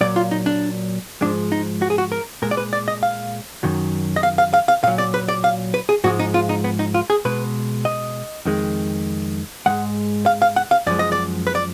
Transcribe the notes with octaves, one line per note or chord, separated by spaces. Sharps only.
A#2 F#3 D5
F4
D#4
D4
G#2 F3 G#3 D4
D#4
F#4
G#4
F#4
A#4
A#2 G#3 A#4
D5
B4
D5
D#5
F5
F#2 D#3 F#3
D#5
F5
F5
F5
F5
A#2 F#3 F5
D5
B4
D5
F5
B4
G#4
G#2 F3 G#3 F#4
D#4
F4
D#4
B3
D#4
F4
G#4
B2 G#3 B4
D#5
F2 D#3 G#3
G#2 F3 G#3 F#5
F5
F5
F#5
F5
F#2 F3 G#3 D5
D#5
D5
B4
D5